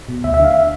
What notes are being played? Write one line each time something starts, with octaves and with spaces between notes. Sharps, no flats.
B2
D2 E5
E5
D3
F5
E5